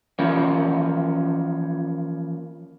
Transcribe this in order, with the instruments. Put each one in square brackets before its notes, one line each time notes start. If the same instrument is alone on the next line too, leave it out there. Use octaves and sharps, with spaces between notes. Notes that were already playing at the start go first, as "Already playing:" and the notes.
[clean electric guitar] E3 F3 A#3 C#4